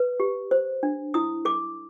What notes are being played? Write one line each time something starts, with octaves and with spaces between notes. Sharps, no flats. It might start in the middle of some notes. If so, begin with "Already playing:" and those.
Already playing: B4
G4
C5
D4
E4 D#6
A4 D6